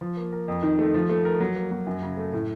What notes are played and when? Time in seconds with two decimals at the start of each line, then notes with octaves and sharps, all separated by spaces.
0.01 F3
0.17 A#3
0.32 A#4
0.48 F2
0.63 D#3
0.79 A3
0.94 F3
1.09 A3
1.25 A#4
1.40 F#3
1.56 A#3
1.71 F#3
1.87 F#2
2.02 C#3
2.17 A3
2.33 A2